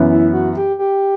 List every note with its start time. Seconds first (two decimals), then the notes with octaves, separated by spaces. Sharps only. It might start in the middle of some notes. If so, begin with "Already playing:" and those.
Already playing: F#2 E3 B3
0.12 E4
0.33 F#4
0.57 G4
0.79 G4